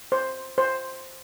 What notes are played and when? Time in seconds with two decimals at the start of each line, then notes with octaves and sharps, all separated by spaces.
0.12 C5
0.58 C5